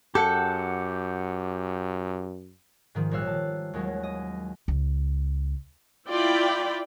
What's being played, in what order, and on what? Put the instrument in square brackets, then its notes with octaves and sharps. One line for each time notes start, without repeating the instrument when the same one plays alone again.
[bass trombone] F#2 [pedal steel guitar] G4 F#5 G5 [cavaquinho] A4
[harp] G#2 D#3 F3
A#1 G3 C#5 F5 E6 F#6
A5
D#2 F#3 G#3 C#4
D#5
[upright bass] C#2
[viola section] E4 F4 D5 G5 B5